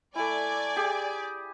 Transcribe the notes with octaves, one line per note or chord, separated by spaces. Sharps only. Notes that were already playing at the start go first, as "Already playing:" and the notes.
A3 E4 D5 G#5
G4 G#4